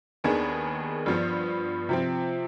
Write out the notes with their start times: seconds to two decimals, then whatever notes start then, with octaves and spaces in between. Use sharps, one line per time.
0.24 D#2 D#3 B3 D4 G#4
1.06 G2 F3 B3
1.89 C3 F3 C4